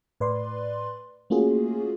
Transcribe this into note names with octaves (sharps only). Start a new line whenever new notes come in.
A2 B4 D5 C6
A3 A#3 C#4 F4 F#4 G#4